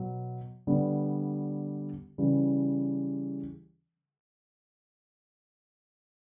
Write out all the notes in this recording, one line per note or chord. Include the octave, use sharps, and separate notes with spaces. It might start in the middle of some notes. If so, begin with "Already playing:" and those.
Already playing: B2 F#3 B3
D3 G3 B3
C#3 E3 G3